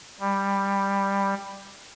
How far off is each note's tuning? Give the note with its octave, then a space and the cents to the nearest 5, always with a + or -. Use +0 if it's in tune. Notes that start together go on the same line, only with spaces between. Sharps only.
G3 +10